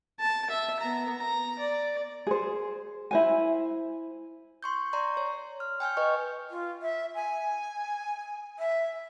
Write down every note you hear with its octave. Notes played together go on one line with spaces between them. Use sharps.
A5
E5
B3 A#5
A#5
D5
G#4 C5
E4 C5 G#5
C6 C#6 G6
D5 A#5 C6 C#6
C#5
F6
G5 G#5 F6 G6
B4 D#5 C#6
F4
E5
G#5
E5